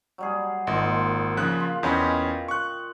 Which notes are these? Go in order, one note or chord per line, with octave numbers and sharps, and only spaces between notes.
F#3 G3 G#4
G#1 A#2 G#3
C#3 F3 F#6
F4
E2 C#4 D#5 F5 G5 B5
C#6 F#6